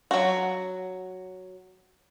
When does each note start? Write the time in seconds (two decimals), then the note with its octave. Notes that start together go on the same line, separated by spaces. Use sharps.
0.11 F#3 F#4